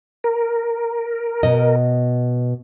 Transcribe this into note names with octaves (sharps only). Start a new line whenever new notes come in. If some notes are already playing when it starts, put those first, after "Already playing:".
A#4
B2 D#5